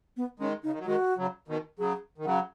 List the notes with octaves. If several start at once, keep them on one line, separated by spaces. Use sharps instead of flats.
B3
D#3 G#3 C#4
C#3 D#4
D#3
F#3
D#3 G#3 F#4
C#3 F#3
B2 D#3
C#3 F#3 G#4
D#3
C#3 F#3 F#5